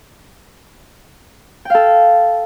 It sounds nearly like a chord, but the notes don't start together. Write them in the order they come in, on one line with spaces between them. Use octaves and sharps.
G5 F5 A4